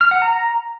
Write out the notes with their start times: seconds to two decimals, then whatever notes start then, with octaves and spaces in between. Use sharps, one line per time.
0.01 F6
0.11 F#5
0.22 A#5